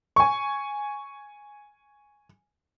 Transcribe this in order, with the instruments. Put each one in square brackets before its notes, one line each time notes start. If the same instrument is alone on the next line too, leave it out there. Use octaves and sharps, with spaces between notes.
[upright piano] G#5 C#6